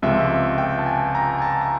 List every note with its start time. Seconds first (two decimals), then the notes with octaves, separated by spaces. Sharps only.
0.02 C#2 C3 F3 G#3 E5
0.58 G5
0.79 A5
0.86 G#5
1.15 A#5
1.38 G#5
1.42 A5
1.61 A#5